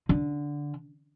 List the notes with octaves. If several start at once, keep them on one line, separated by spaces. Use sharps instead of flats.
D3